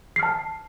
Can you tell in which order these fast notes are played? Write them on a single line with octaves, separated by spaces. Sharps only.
C7 F6 A5